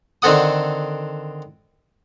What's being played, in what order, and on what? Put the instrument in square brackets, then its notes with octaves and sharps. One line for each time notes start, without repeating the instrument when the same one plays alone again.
[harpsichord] D3 D#3 C4 A4 F#5 D#6